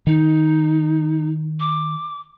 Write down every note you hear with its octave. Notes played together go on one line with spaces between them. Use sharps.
D#3 D#4
D6